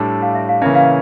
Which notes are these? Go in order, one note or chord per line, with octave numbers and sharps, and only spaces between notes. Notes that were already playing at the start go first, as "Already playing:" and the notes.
Already playing: A2 G3 D4 A4
F5
E5
F5
C#3 E3 A#3 C#4 E5
F5